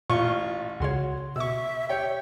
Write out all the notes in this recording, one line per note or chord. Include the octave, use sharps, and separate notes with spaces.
A1 A#2 F4 C#6
C#2 C#3 F#4 C#5 C6
B2 E5 C#6 E6
G4 C#5 G5